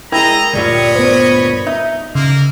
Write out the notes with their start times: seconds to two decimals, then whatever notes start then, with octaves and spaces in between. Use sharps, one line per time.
0.12 G#3 E4 A#4 D#5 G5 A#5 E6
0.53 D2 G2 A#2 C#5 D#5 B5
0.95 B3 B4 C5
1.67 D#4 E5
2.15 C#3 A#3